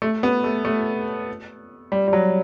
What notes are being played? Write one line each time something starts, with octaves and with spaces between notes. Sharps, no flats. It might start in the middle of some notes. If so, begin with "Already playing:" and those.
A3
B3
A3
A3
G3
G3
F#3